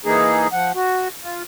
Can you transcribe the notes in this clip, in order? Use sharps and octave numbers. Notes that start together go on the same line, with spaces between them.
E3 A#3 D#4 G#4
F3 F#5
F#4
F4